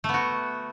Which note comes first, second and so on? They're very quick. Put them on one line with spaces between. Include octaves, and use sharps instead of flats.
A3 B3 F#4